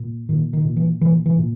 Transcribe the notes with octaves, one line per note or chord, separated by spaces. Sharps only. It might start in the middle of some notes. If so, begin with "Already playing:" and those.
Already playing: A#2
A#2 D#3
D#3
A#2
E3
A#2 E3
E3
A#2